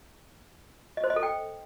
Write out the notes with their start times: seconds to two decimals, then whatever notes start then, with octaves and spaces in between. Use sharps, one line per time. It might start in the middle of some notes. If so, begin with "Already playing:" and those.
0.97 D#5
1.04 C5
1.10 D#5
1.16 A4
1.23 G5